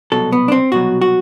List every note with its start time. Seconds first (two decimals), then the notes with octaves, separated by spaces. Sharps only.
0.12 C2 B2 F#3 A4
0.32 B3
0.48 D4
0.52 C4
0.72 C2 B2 F#3 F#4
1.02 F#4